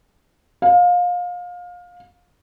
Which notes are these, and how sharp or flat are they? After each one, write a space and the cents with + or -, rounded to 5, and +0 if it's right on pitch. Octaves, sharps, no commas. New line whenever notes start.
F5 +25